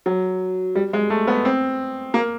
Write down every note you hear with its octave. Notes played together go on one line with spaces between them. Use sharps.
F#3
G3
G#3
A3
B3
C4
A#3